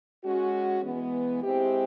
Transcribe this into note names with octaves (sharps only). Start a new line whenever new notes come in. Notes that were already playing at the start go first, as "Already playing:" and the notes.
G#3 C#4 F#4
E3 G#3 B3
G#3 C4 E4 G4